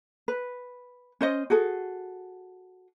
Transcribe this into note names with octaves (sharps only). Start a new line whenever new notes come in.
B4
C#4 C5 D#5
F#4 G#4 A4